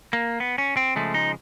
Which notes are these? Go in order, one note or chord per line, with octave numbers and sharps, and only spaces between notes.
A#3
B3
C#4
C4
C#3 F3 G#3 A3
D#4